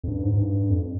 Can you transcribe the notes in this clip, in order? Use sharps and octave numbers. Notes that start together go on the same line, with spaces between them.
F2
G2
G#2
G#2
G2
F2